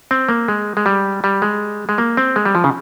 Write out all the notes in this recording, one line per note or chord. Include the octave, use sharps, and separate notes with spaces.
C4
A#3
G#3
G#3
G3
G3
G#3
G#3
A#3
C4
G#3
G3
F3
C#3